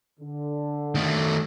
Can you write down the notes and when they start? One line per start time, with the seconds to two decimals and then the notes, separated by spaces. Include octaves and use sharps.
0.20 D3
0.95 D#3 A3